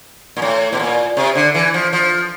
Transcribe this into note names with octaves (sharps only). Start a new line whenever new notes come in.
A#2
A2
B2
A#2
C3
D3
E3
F3
F3